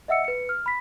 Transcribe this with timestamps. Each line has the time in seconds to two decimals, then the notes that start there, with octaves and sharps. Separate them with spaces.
0.08 D#5 E5 F#5 E6 C#7
0.24 B4 C#7
0.49 F6
0.66 B5 B6